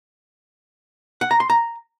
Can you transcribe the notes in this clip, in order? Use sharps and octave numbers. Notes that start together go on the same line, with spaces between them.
F#5
A#5
C6
A#5